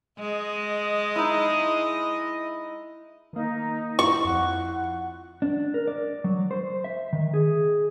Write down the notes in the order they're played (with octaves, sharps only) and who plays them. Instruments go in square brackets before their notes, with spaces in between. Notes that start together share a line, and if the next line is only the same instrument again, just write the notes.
[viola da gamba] G#3 [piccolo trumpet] D#5
[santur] D#4 E4
[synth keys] D#3 A#3 [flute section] D#4
[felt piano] E4 F4 [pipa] C#6
[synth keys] F2 [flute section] F#5
[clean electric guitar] D4
A#4
D5
F#3
C5
E5
D#3
G#4